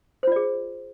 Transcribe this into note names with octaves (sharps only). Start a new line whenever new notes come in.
F4 G#4 C5 D5